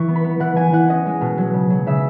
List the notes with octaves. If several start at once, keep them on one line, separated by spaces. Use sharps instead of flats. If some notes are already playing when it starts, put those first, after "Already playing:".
Already playing: E3 C#6
B3
B5
B3
E3 F#5
E3 G#5
E3 F#5
C#4 D#5
G#3
B2
F#3
C#3
F#3
C#3 E5